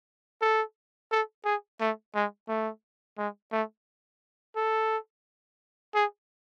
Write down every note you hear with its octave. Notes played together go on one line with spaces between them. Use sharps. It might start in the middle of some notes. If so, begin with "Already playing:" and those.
A4
A4
G#4
A3
G#3
A3
G#3
A3
A4
G#4